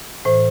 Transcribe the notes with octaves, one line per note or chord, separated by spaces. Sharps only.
A2 E3 C5